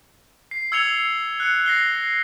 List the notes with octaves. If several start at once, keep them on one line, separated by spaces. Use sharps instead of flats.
C7
E6 G#6 C#7 F7 G7
F#6 C#7
A#6 C7 G7